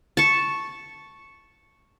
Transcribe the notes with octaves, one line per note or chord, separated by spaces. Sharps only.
A5 C#6